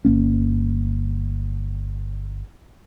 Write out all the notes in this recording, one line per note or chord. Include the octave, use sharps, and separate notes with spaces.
G1 A#3 C#4